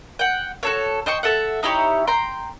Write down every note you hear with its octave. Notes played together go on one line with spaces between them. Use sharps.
F#5 G5
F#4 A4 C#5
C5 D#5 G5 C#6
A4 E5 F#5
D#4 E4 G4 C#5
G5 A#5 C6